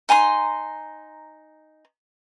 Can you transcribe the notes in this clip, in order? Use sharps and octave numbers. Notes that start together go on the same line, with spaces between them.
D#4 G#5 A#5 C6